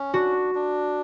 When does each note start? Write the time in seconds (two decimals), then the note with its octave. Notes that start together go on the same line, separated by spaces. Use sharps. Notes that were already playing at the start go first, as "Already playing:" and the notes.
Already playing: C#4
0.14 D4 F#4
0.55 D4